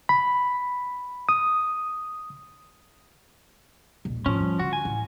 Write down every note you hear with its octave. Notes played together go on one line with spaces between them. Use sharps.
B5
D#6
D#1 B1
A2 F3 C#4
G3
D3 F#4
G#5
A1